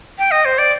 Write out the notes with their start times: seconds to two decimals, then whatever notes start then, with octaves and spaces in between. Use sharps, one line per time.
0.19 G5
0.31 D#5
0.45 C5
0.58 D5